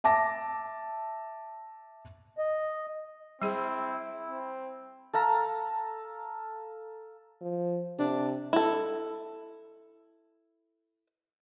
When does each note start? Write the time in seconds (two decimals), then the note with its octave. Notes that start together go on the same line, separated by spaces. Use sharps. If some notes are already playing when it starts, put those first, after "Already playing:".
0.04 E5 A5 D6 A#6
2.38 D#5
3.42 G3 C4 E4 G#4
4.30 C4
5.13 A4 F5 A#5
7.41 F3
7.99 C3 D4
8.53 E4 A4